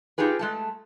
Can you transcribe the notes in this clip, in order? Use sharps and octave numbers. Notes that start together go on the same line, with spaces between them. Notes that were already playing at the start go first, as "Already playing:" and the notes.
D#4 F4 G4 G#4 B4
G#3 A3 A5